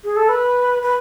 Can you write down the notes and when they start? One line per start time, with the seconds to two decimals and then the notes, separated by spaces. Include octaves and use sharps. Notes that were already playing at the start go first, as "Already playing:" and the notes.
0.04 G#4
0.16 A4
0.29 B4
0.83 B4